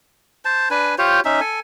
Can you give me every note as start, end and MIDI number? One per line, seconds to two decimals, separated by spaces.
0.45 0.69 72
0.45 0.69 81
0.71 0.95 62
0.71 0.95 71
0.71 0.95 80
0.98 1.20 65
0.98 1.20 67
0.98 1.20 72
0.98 1.20 73
1.25 1.40 61
1.25 1.40 63
1.25 1.40 76
1.40 1.60 69
1.40 1.60 80